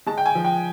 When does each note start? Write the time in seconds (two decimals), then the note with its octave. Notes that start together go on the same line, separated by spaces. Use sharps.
0.06 G#3 A5
0.18 G5
0.26 G#5
0.35 F3
0.45 G5